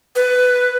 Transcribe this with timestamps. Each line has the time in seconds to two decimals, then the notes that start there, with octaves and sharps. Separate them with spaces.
0.15 B4